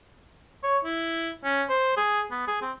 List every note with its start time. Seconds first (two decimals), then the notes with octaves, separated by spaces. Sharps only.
0.63 C#5
0.85 E4
1.44 C#4
1.70 C5
1.97 G#4
2.32 B3
2.48 G#4
2.62 C4